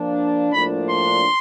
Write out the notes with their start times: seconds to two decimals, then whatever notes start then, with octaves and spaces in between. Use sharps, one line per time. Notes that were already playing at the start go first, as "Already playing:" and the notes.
Already playing: F3 A#3 D4
0.53 A2 F3 A#3 D4 B5
0.90 C6